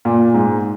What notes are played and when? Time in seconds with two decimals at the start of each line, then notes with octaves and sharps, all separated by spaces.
0.05 A#2
0.34 G#2